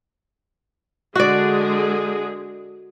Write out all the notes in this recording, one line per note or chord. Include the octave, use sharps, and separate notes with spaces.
D3 G#3 F#4 G#4 D5